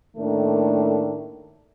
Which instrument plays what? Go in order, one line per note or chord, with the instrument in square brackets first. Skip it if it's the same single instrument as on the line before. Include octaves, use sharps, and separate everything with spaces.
[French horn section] A2 D#3 A3 A#3 D4 A4